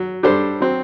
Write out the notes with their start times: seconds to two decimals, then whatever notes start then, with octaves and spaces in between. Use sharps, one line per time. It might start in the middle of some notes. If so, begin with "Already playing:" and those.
Already playing: F#3
0.23 G3 D4 A4 C5
0.60 F#3 C4